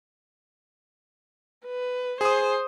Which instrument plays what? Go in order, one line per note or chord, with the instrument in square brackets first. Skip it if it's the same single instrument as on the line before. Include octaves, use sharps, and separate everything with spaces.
[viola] B4
[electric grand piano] G#4 D#6 [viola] C5